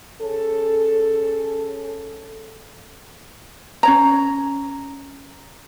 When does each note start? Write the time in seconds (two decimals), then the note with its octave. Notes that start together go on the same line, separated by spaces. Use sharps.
0.20 C#4 G#4 A4
3.83 C#4 C#5 A#5